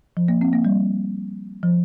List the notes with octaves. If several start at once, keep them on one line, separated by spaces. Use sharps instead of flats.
F3
A#3
C4
A#3
G3
F3